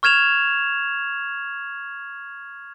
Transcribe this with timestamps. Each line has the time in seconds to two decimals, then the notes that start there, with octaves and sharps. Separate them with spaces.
0.03 C#6 F6 G#6 E7 F7